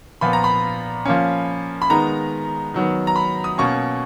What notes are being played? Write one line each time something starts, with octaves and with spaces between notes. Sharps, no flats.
A#2 F3 B3 B5
A#5
B5
F3 A#3 C#4
B5
D#3 G#3 B3 A#5
D#3 F#3 B3
A#5
B5
D#6
B2 A#3 C#4 C#6